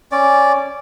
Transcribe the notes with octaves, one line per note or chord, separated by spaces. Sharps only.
C#4 D5